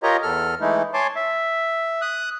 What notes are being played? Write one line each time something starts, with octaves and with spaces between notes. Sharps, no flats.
F4 G4 A#4 C#5 D#5 A#5
E2 A4 F6
E3 G#3 A3 D#4 E4
C#5 G#5 A5 C6 D6
E5
D#6 F#6